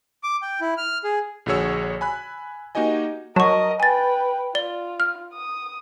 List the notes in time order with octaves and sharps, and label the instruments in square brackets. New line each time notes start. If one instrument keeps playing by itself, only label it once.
[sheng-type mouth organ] D6
G5
E4
F6
G#4
[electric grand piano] A#1 D3 F#4 G#4 C#5 E6
G#5 B5 F#6
A#3 D#4 F#4 G4 D#5 G#5
[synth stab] F#3 [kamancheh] A#4 D#5 [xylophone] A5 C#6
[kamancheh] B4 G5 [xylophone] G#5 A6
[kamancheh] F4 [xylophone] D5 G7
[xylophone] F6
[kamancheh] D#6